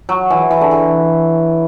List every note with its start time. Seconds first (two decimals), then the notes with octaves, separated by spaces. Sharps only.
0.09 F#3
0.30 E3
0.50 E3
0.61 D3
0.71 E3